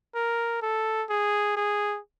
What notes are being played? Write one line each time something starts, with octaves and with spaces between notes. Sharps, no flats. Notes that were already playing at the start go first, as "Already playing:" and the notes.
A#4
A4
G#4
G#4